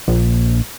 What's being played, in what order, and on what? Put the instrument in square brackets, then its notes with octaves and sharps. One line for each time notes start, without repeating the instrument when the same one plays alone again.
[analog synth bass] A#1